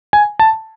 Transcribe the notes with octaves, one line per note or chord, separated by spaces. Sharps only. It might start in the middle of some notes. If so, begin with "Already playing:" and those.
G#5
A5